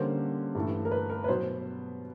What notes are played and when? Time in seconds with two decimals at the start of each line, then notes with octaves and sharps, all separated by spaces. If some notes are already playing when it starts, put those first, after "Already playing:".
Already playing: D3 G3 A#3 C#4 C5
0.55 G2 E3 A3
0.85 A#4
0.91 B4
1.10 A#4
1.24 B4
1.28 B2 F#3 B3 C5